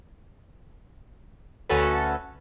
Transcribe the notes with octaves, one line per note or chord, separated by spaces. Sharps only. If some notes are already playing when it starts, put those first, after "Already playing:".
D2 C#4 F#4 A4 B4